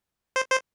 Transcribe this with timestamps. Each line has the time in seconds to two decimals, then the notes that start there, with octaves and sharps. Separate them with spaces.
0.36 C5
0.51 C5